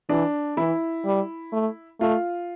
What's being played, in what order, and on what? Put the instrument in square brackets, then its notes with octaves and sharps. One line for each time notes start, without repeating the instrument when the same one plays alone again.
[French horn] E3 [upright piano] D4
[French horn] E3 [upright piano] E4
[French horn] G3
A3
[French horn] A3 [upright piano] F4